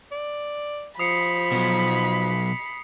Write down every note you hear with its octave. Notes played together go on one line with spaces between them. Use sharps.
D5
F3 B5 D#6 C7 C#7
B2 F#3